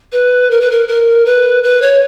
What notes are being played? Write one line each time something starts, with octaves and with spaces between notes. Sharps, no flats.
B4
A#4
B4
A#4
A#4
B4
B4
C#5